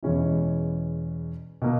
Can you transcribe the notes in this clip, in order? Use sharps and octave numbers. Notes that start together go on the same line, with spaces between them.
E2 B2 G#3 C#4 E4
B2 A#3